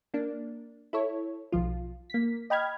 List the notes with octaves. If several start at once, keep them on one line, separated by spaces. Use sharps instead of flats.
A#3 D4
E4 A4 C#5
B1 F3 F4
A#3 B6
D#5 G5 B5 F6 G#6